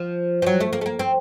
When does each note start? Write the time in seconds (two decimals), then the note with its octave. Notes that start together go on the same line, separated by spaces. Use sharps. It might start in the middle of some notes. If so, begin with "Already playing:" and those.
Already playing: F3
0.42 F3
0.46 F#3
0.60 A3
0.73 A#3
0.81 A3
0.86 A#3
0.99 C4